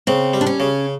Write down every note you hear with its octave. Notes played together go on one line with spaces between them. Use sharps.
C#3 C4
G3
D4
C#4
C#3